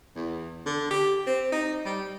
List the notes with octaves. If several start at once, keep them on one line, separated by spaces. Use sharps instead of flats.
E2
D3
G4
C4
D#4
G3